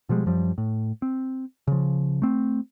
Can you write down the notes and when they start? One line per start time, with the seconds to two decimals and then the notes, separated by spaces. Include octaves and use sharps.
0.09 B2 F3 G3 G#3
0.26 F#2 F3 G3
0.58 A2
1.02 C4
1.67 C#3 F3
2.22 A3 C4